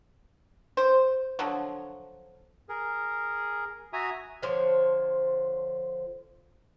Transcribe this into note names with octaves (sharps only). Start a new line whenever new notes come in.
C5
D3 F3 F#3
G#4 A#4
F#4 E5 G#5 A#5 D#6
D3 F3 C5 C#5